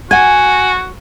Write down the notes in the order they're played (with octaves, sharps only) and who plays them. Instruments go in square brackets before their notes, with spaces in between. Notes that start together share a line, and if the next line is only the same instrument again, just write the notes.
[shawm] F#4 [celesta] F#5 G#6 [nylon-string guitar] G#5